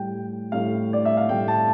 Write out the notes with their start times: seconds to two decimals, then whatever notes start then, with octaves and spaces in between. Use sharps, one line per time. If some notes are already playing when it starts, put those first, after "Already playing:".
Already playing: A2 G3 G5
0.52 A2 G3 F5
0.93 D5
1.05 E5
1.17 F5
1.29 A2 G3 G5
1.48 A5